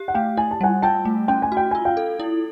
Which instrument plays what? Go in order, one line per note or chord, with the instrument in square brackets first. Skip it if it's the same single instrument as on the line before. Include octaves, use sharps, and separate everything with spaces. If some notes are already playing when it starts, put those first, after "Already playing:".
Already playing: [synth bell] G4
[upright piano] F#5
[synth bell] A3 [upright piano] F5 G5
[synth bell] E4 [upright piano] G#5
[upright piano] A5
[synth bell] G3 [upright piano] F#5 G#5
[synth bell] F4 [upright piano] G5 A5
[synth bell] A3
[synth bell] C#4 [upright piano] G5
[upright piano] G#5
[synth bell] F#4
[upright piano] G5
[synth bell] F4 [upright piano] G#5
[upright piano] F5 G5
[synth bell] A4
E4